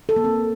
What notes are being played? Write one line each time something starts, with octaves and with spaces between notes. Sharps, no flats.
A4
A#3
C4